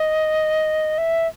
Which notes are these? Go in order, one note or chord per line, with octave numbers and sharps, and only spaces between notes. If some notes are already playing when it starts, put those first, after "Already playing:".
Already playing: D#5
E5